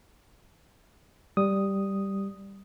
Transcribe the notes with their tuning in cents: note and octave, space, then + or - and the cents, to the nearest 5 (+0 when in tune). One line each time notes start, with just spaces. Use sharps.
G3 +0 D#6 +0